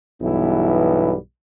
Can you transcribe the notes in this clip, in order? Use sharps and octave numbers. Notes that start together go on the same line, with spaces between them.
B1 G2 E3 G3 B3 E4